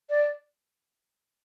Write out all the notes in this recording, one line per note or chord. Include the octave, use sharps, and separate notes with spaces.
D5